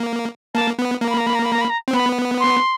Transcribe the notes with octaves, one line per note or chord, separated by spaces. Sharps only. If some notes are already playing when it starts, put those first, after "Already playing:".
Already playing: A#3
A#3 A5
B3
A#3 A#5
B5
A#5
B5
A#5
B5
A#5
B5
A#5
C4
B3 B5
C6